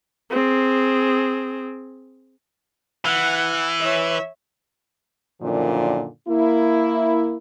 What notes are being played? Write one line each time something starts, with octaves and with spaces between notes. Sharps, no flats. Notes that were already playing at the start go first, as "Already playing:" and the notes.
C4 G#4
E3 F#5
C#5 E5
F#2 A#2 D3 D#3 F3
A#3 E4